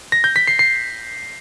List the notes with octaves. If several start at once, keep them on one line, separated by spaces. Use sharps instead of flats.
A#6
G6
B6
C7
C7